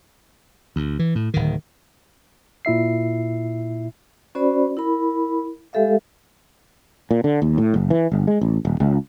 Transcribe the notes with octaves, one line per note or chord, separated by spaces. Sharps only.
D2
E3
A2
D1 D#3
A#2 E4 E5 C7
C#4 F#4 C5 D5 B5
E4 A#4 B5
G#3 G4 A4 E5 F5
A#2
D3
D#2
A2
F#1
E3
G1
G#3
A1
D#1
C#2